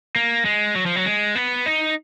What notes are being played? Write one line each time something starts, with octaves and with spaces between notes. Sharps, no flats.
A#3
G#3
F#3
F3
F#3
G#3
B3
D#4